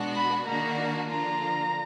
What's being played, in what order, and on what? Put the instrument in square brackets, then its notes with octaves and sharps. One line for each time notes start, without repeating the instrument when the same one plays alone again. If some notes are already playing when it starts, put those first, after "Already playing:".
Already playing: [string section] B2 G#3 B3 D4 F#4
[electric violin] B5
[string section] D#3 A#3 D4 F#4 [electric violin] A#5
[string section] D3 F3 A#3 D4 F4 [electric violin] A#5